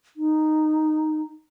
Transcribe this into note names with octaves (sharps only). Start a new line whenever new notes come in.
D#4